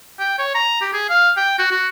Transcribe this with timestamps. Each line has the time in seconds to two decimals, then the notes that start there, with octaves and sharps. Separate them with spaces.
0.19 G5
0.38 C#5
0.55 A#5
0.81 G4
0.93 G#4
1.09 F5
1.37 G5
1.59 F#4
1.71 F#4